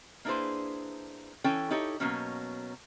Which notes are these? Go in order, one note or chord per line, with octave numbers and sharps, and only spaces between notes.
A#3 D4 E4 G#4 B4 C5
E3 C#4 A4 G5
D#4 E4 G4 A4 C#5
B2 F#3 A#3 C#4